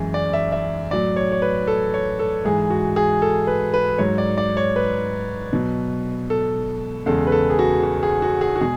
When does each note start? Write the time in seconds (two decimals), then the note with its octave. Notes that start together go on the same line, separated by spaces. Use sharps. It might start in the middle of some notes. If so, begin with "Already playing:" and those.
Already playing: F#2 E3 G#3
0.14 D5
0.33 E5
0.52 E5
0.91 A2 F#3 D5
1.16 C#5
1.32 C#5
1.42 B4
1.67 A4
1.94 C#5
2.19 A4
2.45 G#2 E3 G#3 G#4
2.70 F#4
2.96 G#4
3.22 A4
3.47 B4
3.74 B4
3.98 G#2 F#3 C#5
4.18 D5
4.38 D5
4.57 C#5
4.76 B4
5.53 B2 F#3
6.30 A4
7.06 E2 C#3 G#3 A4
7.27 B4
7.32 A4
7.50 G#4
7.59 F#4
7.83 F#4
8.03 G#4
8.22 F#4
8.41 G#4
8.56 F#4
8.61 B2 G#3 G#4